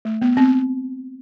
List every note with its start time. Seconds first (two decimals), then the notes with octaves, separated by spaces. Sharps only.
0.05 A3
0.22 B3
0.37 C4